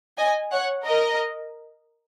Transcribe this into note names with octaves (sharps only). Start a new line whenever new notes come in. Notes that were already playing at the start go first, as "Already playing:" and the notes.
D#5 G#5
C#5 F#5
A#4 D#5